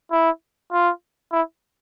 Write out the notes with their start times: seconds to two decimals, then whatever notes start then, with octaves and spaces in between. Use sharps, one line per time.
0.12 E4
0.72 F4
1.32 E4